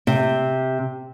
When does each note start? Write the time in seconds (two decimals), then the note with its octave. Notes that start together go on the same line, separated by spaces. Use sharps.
0.07 C3